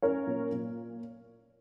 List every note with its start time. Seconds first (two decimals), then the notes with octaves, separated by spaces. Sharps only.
0.02 C#4 A#4 C#5
0.27 A#2
0.52 A#2